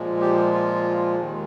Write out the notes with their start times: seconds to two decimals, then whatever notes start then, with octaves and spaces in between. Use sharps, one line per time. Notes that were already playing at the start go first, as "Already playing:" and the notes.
Already playing: A#2 F3 G#3
0.21 G4
0.53 F4
1.20 D#2 D#3 G#3